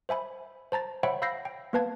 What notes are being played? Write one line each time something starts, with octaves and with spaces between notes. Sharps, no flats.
C5 E5 G#5 B5
C5 A5 A#5 A6
C5 C#5 E5 F#5 G5 B5
F5 B5 E6 G6 A#6 C7
G5
A#3 B3 B4 F5 A5 G#6